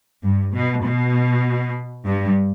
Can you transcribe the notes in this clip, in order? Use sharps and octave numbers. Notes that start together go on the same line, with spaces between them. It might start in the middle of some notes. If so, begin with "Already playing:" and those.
G2
B2
B2
G2